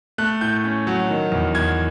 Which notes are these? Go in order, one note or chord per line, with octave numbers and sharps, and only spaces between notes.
A3 F#6
A2 G6
C#4
F#3
D#3
E2
E2 G#6